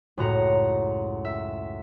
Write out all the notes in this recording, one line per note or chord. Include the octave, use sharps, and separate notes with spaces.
C#2 F#2 A2 F#4 A#5 C#7
E5